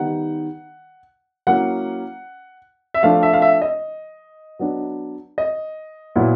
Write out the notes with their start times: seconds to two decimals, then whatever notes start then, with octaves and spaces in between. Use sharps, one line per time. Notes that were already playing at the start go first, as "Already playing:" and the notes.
Already playing: D#3 G3 B3 D#4 F#5
1.47 F#3 A#3 C#4 E4 F#5
2.94 E5
3.03 F3 A3 D4 F5
3.23 E5
3.33 F5
3.42 E5
3.62 D#5
4.59 F#3 B3 D4
5.38 D#5
6.16 A#2 F#3 B3 E4